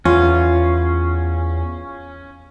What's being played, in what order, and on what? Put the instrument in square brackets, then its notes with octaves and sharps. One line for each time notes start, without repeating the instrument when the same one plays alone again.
[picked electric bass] E2 [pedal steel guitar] C#4 [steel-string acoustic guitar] F4